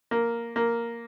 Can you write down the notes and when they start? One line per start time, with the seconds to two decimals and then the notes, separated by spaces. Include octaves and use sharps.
0.11 A#3
0.56 A#3